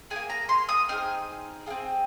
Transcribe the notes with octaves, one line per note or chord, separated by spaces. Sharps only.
D#4 G#4 G#5
A#3
A#5
C6
D#6
C4 D#4 G#4 F6
C4 F4 G#4